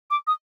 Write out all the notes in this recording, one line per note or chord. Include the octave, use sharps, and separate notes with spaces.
D6
D#6